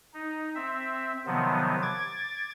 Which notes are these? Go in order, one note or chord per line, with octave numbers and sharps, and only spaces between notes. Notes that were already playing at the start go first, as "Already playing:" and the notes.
D#4
C4 E5
C3 D#3 F3 F#3 B3
D6 G#6 A6